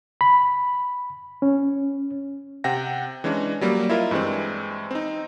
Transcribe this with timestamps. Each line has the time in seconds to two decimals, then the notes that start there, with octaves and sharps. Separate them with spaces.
0.21 B5
1.42 C#4
2.64 C3 F#5 G5 A#6
3.24 E3 G#3 C#4 D4
3.61 F#3 G3 A#3
3.90 E4 F4 A#4 D#5
4.11 G2 E3 G3 G#3 C4
4.91 C4 D#4